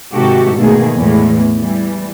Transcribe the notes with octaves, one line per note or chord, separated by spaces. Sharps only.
G#2 C3 D#3 F#4 G4 A4
B2 D#3 A3 A#3 G#4
E2 A2 E3 G#3
E3 G3